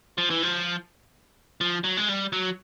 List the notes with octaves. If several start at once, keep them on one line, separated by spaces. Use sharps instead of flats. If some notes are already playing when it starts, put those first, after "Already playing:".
F3
E3
F3
F3
F#3
G#3
G3
F#3